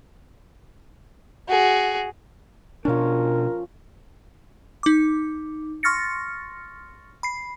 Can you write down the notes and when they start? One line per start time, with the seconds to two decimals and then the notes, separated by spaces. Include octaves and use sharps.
1.48 F#4 G#4
2.85 B2 F3 C#4 D4 A#4
4.83 D#4 D6
5.83 C6 C#6 F6 A6 A#6 C#7
7.23 B5 C7